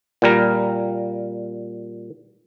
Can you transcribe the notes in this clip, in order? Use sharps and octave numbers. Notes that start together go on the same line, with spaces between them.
A#2 G3 A#4